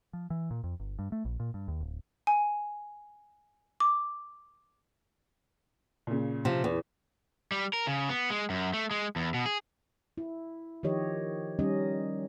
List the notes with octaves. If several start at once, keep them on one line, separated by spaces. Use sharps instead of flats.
F3
E3
A#2
F2
G1
G2
A3
A#1
A#2
G2
D#2
D1
G#5
D6
A#2 C#3
C3 F3
E2
G3
A#4
C#3
B3
G#3
F#2
A3
G#3
E2
B2
G#4
E4
D#3 F3 G4 C#5 D#5
D#3 G3 C#4 D#4 D#5